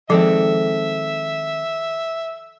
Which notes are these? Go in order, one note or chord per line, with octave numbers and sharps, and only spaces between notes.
D#3 F3 G#3 C4 A4 E5